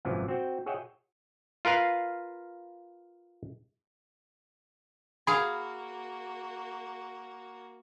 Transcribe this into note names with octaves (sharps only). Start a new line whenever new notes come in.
G#1 F#2 C3 E3 F3
C4 F#4 G5
G#4 C#5 D#5 E5 F#5 G5
F4 A#4 B4 F5
A#3 F#4 G#4 F5 B5